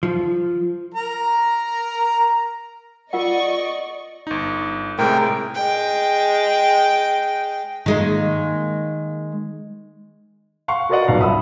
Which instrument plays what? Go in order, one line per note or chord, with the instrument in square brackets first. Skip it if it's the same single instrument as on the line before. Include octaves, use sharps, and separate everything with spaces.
[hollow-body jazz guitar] F3
[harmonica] A#4 A#5
[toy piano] F4 A#4 F#5 [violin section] D5 D#5 C#6
[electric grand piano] G1 D#4
[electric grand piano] A2 C3 G#3 [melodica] A#4 G5
[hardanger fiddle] G#3 G5
[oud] D#3 G#3 A#3
[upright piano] F5 F#5 C6 C#6
F#4 A#4 B4 D5 D#5 F#5
D#1 B1 D#3 F5
E5 B5 D#6 E6